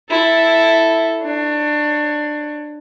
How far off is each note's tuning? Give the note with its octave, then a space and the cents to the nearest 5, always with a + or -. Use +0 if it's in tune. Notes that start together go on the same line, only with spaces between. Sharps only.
E4 +0 A4 +0
D4 +20 C#5 +0